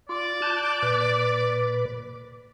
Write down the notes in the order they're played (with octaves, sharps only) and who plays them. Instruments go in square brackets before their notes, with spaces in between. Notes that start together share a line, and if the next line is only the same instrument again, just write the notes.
[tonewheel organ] F4 [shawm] D5
[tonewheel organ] A5 F#6 G6
A#2 B4